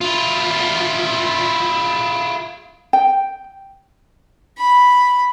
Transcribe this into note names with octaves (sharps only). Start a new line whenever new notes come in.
E4 F4
G5
B5